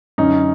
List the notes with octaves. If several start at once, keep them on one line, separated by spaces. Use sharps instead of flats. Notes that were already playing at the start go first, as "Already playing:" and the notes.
F#2 D3 C#4 D#4